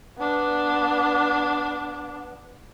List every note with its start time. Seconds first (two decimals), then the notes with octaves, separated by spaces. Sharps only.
0.18 B3 D4